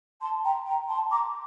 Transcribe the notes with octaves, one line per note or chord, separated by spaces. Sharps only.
A5 C6
G5 A#5
G5 A#5
A5 C6
A#5 D6